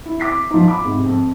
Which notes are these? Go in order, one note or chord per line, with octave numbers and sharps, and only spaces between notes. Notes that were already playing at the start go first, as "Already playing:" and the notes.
E4
D6 B6 C7
F3 D#4
B5 D6
G#2 C3
F2